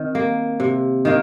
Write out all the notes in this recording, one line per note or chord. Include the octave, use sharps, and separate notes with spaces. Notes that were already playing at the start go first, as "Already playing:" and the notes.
Already playing: D#3 C4
A#3
C3
D#3 A#3